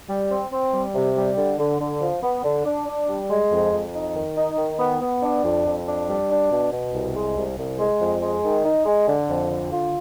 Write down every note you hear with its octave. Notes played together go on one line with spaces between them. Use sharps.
G3
C4
C4
G3
C3
G3
D3
D3
D3
F3
B3
D3
D4
D4
G3
G#3
F2
F2
D#4
D#3
D#4
D#3
B3
B3
D4
F2
F2
D4
G3
D4
B2
B2
C2
G#3
C2
C2
G#3
F2
G#3
D#3
D#4
G#3
D3
F2
D3
F4